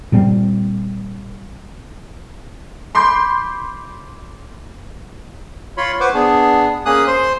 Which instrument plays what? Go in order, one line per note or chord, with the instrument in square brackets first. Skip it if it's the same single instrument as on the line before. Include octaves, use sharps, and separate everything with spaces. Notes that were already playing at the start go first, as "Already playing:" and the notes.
[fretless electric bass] A#2 G3 C4
[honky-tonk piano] B5 C6 D6 G6
[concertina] F4 C#5 B5 C6
B4 C5 F#5 C#6 D6
B3 D4 G#4
A#3 C#4 G#4 D#6 F#6
C5 C6